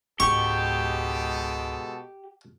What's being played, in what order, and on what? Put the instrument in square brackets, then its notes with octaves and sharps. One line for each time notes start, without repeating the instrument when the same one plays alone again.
[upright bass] C#2 G#2 [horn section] B2 G#3 A4 [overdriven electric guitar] G4 [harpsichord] C#6